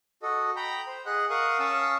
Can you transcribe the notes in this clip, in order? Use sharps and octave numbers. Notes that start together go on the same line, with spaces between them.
F#4 A4 D#5
G5 A#5 B5
C5
G#4 D#5 F#5 F#6
A#4 F5 F#5 C#6 D#6
C#4 F5 A5 C#6 D#6 E6